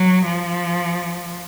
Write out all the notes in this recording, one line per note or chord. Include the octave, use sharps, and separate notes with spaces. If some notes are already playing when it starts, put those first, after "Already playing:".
Already playing: F#3
F3